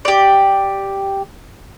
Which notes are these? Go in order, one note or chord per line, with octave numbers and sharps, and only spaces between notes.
G4 D5